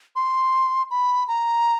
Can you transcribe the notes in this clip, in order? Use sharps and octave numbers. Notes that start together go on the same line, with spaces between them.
C6
B5
A#5